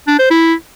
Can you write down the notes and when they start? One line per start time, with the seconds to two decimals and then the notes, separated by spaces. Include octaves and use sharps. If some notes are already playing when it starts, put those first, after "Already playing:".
0.08 D4
0.19 C5
0.30 E4